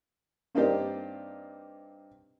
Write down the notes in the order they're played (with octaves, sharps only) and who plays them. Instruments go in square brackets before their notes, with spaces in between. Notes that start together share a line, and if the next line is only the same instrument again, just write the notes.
[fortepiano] G2 A#3 C4 D#4 G4 D5